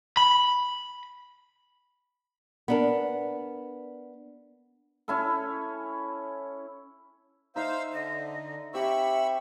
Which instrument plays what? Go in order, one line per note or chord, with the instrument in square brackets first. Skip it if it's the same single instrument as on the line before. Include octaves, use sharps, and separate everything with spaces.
[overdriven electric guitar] B5
[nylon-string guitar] B3 D4 A#4
[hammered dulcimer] C#4 E4 A4
[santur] D#4 E5 [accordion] C5 F5 E6
[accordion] D3 [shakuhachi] D#5
[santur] C4 G4 D6 [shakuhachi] E5 [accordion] B5 C#6 E6